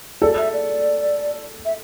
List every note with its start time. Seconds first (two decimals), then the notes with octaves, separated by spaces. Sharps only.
0.22 A4 D5
0.38 E5
0.53 D5
1.65 E5